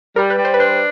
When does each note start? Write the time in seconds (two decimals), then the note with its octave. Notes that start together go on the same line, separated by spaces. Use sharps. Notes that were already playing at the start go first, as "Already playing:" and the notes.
0.16 G3 A#4
0.30 B4
0.38 G3
0.45 C5
0.54 B4
0.59 D4 C5